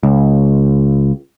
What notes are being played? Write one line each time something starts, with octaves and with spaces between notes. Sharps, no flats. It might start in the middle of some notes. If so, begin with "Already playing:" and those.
C#2